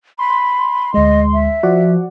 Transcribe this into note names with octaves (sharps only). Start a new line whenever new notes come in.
B5 C6
D2 G#3 D#5
E5
F3 F#4 D5 F#5